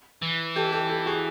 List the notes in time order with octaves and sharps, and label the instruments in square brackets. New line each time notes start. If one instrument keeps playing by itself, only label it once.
[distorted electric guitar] E3
[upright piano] G4 A4
G4 A4
G4 A4
F#4 G#4